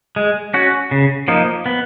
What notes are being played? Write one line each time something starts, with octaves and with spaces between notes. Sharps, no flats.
G#3
C#4 F#4
C#3
F3 A#3 D#4
B3